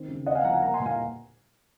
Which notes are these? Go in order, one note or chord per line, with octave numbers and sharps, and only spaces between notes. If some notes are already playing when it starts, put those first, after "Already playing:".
Already playing: D#3 C4
C#3
C4 D#5 F#5
F5 G#5
F3 F#5 A#5
F5 G#5
A#3 F#5 A#5
G#5 C6
A#2
F5 G#5